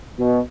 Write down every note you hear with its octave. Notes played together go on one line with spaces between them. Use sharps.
B2